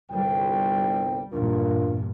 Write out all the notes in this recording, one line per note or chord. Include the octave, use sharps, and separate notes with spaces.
G1 C2 G3 G5
E2 G2 A#2 D4 F4 A#4